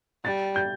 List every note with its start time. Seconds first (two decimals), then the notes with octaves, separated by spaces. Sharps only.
0.25 G3 A6
0.56 G6